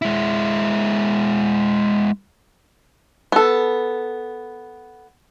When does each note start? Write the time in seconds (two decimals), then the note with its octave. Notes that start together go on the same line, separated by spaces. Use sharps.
0.02 G#3 E4
3.32 B3 A4